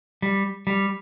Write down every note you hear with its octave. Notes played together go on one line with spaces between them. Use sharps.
G3
G3